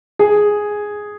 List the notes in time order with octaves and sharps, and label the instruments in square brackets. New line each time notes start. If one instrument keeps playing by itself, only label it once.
[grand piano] G#4